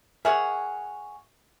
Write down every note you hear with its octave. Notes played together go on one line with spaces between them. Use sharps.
G#4 A#4 C#5 E5 F#5